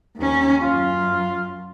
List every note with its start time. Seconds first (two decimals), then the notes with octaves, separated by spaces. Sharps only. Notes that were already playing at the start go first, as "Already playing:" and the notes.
0.17 D#2 C#4
0.62 F#2 F4